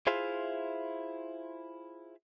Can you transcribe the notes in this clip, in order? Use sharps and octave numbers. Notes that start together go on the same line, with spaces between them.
E4 F4 G#4 C5 E5 F5